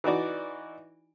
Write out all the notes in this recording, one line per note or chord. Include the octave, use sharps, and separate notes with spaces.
E3 D#4 F#4 D5